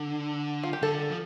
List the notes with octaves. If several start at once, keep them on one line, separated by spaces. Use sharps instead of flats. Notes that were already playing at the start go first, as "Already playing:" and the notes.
Already playing: D3
F4
G4
D3 A4
F3